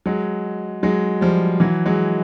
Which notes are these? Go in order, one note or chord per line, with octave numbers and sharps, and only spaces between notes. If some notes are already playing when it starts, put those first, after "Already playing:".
F#3 G#3
F#3 G#3
F3 G3
E3 F#3
F#3 G#3